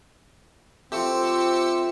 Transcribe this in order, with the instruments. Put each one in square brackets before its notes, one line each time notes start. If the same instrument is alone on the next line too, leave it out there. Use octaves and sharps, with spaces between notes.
[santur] F3 A3 [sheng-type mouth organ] C4 [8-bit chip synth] G4 E6 C#7